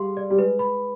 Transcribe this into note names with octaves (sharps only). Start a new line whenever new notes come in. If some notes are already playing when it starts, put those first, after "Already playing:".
Already playing: G3 G#4 F5 C6
D5
G3
G#3 B4
B5